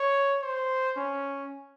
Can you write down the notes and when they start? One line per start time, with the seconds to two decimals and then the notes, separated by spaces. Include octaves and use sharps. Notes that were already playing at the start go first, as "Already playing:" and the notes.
Already playing: C#5
0.42 C5
0.97 C#4